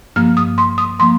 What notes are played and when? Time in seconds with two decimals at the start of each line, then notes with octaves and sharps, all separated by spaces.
0.16 G2 F3 A#3 F6
0.37 D#6
0.58 C6
0.78 D#6
1.00 F3 A#3 C6